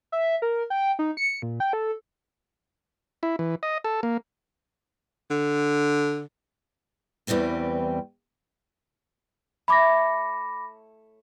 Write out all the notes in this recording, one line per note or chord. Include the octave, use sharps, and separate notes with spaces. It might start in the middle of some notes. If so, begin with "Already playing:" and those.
E5
A#4
G5
D#4
C#7
A#2
G5
A4
E4
E3
D#5
A4
A#3
D3
E2 E3 G3 C4 G4
A3 E4 C#5 B5 D6 A#6